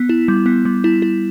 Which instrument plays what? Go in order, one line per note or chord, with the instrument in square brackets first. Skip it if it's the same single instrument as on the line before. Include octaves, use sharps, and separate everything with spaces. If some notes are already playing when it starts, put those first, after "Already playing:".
Already playing: [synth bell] B3
E4
G3
B3
G3
E4
E4